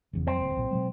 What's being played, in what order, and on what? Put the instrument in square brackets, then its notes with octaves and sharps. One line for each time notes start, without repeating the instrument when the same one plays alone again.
[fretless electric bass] F1 E2 C#3
[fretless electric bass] F2 F#3 [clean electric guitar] C4
[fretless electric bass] D#1 D2
B1 A#2
B2 F#3 G#3